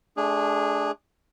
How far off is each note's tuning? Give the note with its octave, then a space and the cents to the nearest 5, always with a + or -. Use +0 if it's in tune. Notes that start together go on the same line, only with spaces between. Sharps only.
A3 -30 D4 +0 G#4 -15